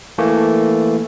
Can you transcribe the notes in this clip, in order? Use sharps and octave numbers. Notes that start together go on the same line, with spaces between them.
E3 A3 A#3